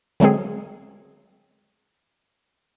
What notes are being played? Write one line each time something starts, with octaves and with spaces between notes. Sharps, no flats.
D3 F#3 G#3 C4 G#4